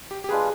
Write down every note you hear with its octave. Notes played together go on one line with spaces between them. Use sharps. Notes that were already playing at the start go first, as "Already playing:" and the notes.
G4
G4
G#3 D4 F4 G#4 B4